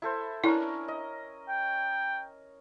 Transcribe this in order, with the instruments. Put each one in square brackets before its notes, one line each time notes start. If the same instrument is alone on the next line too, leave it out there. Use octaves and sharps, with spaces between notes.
[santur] E4 A4 C5
[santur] C#4 D4 A#4 [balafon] E4
[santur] D#5
[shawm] G5